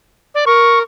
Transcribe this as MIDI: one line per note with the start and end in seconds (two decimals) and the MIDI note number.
0.35 0.45 74
0.47 0.82 70
0.47 0.79 85